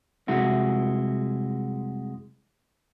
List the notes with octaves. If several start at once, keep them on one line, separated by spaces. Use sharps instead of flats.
C2 F2 C3 G#3 E4 F#4